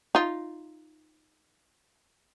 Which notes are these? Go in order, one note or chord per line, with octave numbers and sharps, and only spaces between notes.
D#4 F4